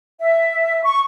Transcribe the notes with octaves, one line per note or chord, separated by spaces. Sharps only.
E5
C#6